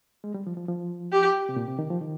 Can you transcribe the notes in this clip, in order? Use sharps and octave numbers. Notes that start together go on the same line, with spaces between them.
G#3
G3
F3
F3
F3
G4
C3
A#2
C3
D#3
F3
D#3